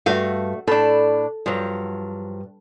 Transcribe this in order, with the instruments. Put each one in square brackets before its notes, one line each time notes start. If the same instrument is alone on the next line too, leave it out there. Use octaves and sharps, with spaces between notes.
[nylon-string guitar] G2 F5 [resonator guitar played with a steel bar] A3 F#4
[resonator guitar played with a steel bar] A2 D4 [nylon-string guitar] A4
[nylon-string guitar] G2 [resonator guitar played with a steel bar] F3 F#3